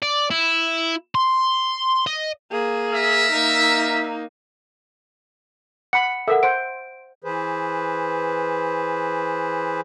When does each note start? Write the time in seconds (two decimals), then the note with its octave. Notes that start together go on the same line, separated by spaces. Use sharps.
0.02 D5
0.31 E4
1.15 C6
2.07 D#5
2.51 A#3 G#4
2.92 A#4 E5
3.32 A#3 D#4
5.93 F#5 B5 C#7
6.28 A4 A#4 E5 F#5
6.43 C5 F#5 D7
7.24 E3 G#4 B4 C5